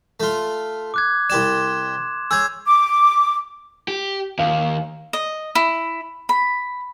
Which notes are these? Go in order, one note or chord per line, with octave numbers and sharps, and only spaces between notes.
A3 F4
D6 F#6 G#6
C2 G4 D5 C6 E7
G#4 C#5 E6 G6 G#6
D6
G4
D#2 F5
D#5
E4
B5